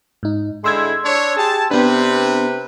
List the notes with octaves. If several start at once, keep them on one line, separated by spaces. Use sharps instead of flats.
G#2 D#4
D3 G#3 E4 C6 E6 G#6
D4 C#5
G4 G#4 A5
C3 B3 D4 B4